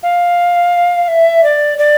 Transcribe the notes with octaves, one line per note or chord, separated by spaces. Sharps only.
F5
E5
D5
D5